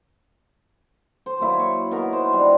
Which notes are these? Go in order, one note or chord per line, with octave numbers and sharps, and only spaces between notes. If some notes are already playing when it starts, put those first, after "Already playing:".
C5
F#3 A#3 E4
C#6
B3 D#4 E4 A#4
C5
G3 D4